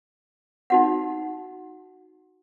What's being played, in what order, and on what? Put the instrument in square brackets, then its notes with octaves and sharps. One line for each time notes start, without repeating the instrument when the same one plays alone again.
[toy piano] D#4 F#4 F#5